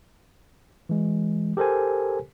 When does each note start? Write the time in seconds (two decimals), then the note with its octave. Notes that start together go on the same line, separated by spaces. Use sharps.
0.89 E3 G#3
1.57 G4 A4 A#4 C5 G#5